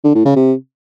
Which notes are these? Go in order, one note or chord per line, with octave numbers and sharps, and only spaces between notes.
D3
A2
C#3
C3